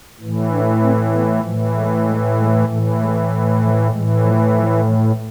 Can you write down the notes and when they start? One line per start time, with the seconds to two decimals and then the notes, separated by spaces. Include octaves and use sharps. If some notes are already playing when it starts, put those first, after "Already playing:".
0.20 A2 E3
0.50 D4
0.82 C4
1.13 B3
1.43 A2 E3 F3
1.75 G#3
2.06 G#3
2.38 G#3
2.68 A2 E3 A3
2.99 G#3
3.61 F3
3.91 A2 E3 G#3
4.23 F3
4.54 F3
4.85 E3